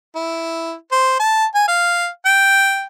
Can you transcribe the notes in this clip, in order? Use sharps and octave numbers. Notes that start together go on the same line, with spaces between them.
E4
C5
A5
G#5
F5
G5